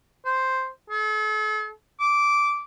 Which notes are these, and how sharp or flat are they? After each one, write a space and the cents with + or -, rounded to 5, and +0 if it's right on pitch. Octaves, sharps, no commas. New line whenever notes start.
C5 +0
A4 -45
D6 -10